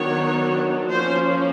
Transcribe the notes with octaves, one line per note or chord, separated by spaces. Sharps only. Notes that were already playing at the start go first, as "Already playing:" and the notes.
Already playing: D#3 F#3 B3 D4 C#5
F3 A#3 C#4 C5